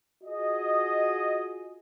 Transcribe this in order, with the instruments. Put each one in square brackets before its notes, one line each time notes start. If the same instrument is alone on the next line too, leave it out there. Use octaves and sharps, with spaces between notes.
[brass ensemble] F4 F#4 G#4 D#5